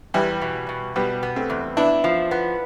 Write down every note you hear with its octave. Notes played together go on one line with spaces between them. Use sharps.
E2 E3 G3
B2
B2
B2 G3 B3
B3
A3 C4
E2
B3 D4 E4
F3
B3